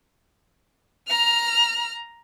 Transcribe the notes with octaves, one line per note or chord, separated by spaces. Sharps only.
A#5 F6